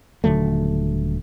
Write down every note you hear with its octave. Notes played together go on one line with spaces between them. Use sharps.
D#1 D3 F#3 A3